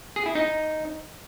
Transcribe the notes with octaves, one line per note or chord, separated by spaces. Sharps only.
G#4
E4
D#4